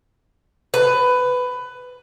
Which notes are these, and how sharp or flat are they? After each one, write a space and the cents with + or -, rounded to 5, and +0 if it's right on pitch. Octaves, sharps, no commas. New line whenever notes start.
B4 +15